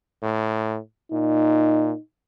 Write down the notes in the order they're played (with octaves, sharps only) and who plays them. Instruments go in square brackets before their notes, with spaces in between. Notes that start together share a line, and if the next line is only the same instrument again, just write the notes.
[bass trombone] A2
[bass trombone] A#2 [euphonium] D#4